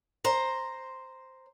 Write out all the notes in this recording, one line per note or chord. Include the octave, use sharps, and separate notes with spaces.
C5 A#5